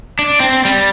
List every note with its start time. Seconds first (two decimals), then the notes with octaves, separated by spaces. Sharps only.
0.19 D4
0.40 C4
0.65 G3